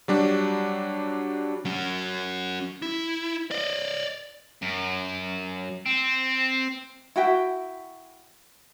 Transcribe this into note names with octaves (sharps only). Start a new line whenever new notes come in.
F#3 G3 D4
F#3 C#4
E4
D5 D#5
F#2
C4
E4 F#4 E5 G5